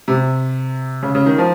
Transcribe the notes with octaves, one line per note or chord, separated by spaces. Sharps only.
C3
C#3
C#3
D#3
F3